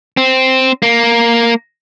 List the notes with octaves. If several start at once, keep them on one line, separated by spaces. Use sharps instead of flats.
C4
A#3